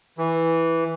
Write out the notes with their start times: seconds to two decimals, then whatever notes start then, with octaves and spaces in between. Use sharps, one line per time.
0.18 E3